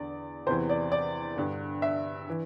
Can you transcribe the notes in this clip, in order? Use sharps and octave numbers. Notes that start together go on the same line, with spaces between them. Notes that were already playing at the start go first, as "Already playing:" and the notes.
Already playing: E2 D3 D5
E2 C3 E3 C5
D5
D5
G2 D3
E5
E3